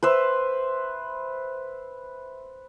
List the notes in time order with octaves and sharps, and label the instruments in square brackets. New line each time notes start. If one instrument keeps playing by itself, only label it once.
[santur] B4 C5 E5